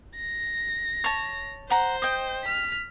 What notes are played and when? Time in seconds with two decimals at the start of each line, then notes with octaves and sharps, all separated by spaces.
0.17 A#6
1.04 C#5 A5
1.70 C5 F#5 A#5
2.02 D#5 G5
2.45 F6 B6